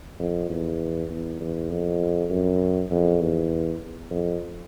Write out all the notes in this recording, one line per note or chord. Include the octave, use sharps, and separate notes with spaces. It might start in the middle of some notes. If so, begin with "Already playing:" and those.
F2
E2
E2
E2
F2
F#2
F2
E2
F2